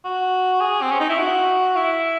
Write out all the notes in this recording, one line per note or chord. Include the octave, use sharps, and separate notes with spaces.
F#4
G#4
C4
C#4
D#4
E4
F#4
E4